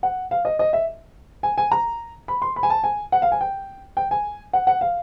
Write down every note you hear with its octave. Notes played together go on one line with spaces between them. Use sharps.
F#5
F5
D#5
D#5
E5
G#5
G#5
A#5
B5
C6
B5
G#5
A5
G#5
F#5
F5
G#5
G5
G5
G#5
F#5
F#5
F5